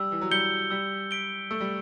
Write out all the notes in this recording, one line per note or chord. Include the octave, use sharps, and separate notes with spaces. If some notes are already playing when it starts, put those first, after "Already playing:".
Already playing: G3 E6
E3
F#3
G3 G6 C#7 G7
G3 E6
B6 D7 G7
A3 E6
G3